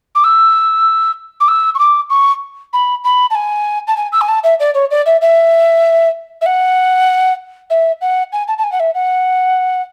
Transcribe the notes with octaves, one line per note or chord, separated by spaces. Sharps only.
D6
E6
D6
E6
C#6
D6
C#6
B5
B5
A5
G#5
A5
G#5
E6
G#5
A5
E5
D5
C#5
D5
E5
E5
E5
F#5
E5
F#5
G#5
A5
A5
G#5
F#5
E5
F#5